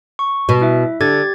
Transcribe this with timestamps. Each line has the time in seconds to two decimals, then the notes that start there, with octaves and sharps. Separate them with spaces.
0.19 C#6
0.49 B2
0.62 E4 E5
1.01 D3 G4 G#6 A6